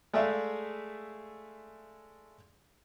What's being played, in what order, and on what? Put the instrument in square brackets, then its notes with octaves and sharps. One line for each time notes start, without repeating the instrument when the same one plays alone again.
[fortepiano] G#3 A3 G#4 D5 E5 F5